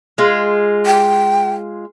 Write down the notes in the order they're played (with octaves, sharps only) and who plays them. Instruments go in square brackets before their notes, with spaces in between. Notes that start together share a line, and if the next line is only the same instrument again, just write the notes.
[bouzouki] G#3 F4
[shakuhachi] G5